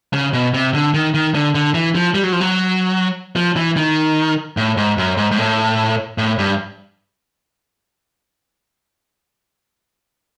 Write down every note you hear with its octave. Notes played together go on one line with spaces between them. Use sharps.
C#3
B2
C3
D3
D#3
D#3
D3
D3
E3
F3
G3
F#3
F3
F#3
F3
E3
D#3
A2
G#2
F#2
G#2
G#2
A2
A2
G2